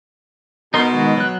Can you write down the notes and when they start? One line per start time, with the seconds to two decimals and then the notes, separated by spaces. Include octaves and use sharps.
0.74 B2 D#4 A#4 C6
0.93 D#3 G#3 F#4
1.17 F#3 F#6